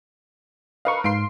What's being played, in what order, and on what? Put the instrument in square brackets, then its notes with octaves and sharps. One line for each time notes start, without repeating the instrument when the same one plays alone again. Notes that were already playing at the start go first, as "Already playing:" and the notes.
[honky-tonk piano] A#4 B4 F5 [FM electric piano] D#5 C#6
[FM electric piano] G#2 F5 C7 [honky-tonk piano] C6 D7